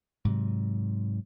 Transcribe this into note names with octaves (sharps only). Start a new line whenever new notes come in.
G#2 C3 F#3